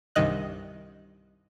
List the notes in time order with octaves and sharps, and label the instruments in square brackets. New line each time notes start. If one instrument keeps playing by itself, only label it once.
[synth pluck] C2 G2 C3 D#3 D#5 F#6